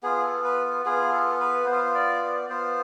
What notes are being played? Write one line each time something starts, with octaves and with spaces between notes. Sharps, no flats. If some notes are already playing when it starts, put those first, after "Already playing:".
B3 F4 G#4
A4
B4
B3 F4 G#4
A4
B4
B3 C5
F4
D5
D5
B3 F4 C5